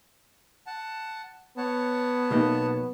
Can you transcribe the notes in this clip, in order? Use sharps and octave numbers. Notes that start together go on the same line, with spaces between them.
F#5 A5
B3 C#5 F#5 A5
B1 A#3 D#4